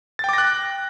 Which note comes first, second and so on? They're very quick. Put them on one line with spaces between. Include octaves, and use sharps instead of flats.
A6 G5 D6 A#6 F#6